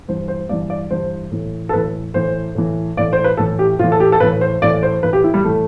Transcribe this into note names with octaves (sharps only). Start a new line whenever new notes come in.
G2 E3 C5
C5
G2 E3 D5
D5
G2 E3 C5
A2 E3
A4
A2 E3 B4
A2 E3 C5
A2 E3
A2 E3 D5
C5
B4
A2 E3 A4
G4
A2 E3 F4
A4
G4
A4
A2 E3 B4
C5
A2 E3 D5
C5
A2 E3 B4
G4
E4
G3
A2 E3 A3